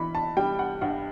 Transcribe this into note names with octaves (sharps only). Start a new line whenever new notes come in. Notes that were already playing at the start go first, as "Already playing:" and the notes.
Already playing: E3 B5
A5
G3 G5
F#5
G2 F#5